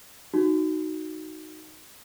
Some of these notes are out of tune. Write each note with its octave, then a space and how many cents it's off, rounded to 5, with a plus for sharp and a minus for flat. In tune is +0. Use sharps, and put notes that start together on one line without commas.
D#4 +0 F#4 +0